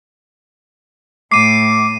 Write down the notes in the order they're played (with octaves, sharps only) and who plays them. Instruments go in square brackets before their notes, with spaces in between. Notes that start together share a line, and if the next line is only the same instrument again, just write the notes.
[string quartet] A2 [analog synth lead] D6 [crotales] C7 D#7